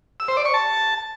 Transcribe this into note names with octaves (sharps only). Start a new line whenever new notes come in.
E6
C5
D5
C#6
A5